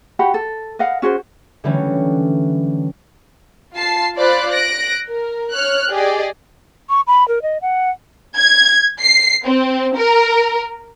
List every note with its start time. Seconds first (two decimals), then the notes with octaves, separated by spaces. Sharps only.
0.19 F#4 G4 F#5 B5
0.34 A4
0.79 B4 D#5 F5 F#5
1.02 C#4 F#4 G#4 C5
1.64 D3 E3 F#3 G3 A3 C#4
3.74 F4 A5 C7
4.16 F4 C5 D5 B5 D6 F#6
4.51 F#6 A#6 D7
5.10 A#4
5.51 C#5 F6 F#6
5.89 G4 G#4 D5 D#5
6.89 C#6
7.07 B5
7.28 A#4
7.42 D#5
7.62 F#5
8.37 G#6
9.01 C7
9.45 C4
9.96 A#4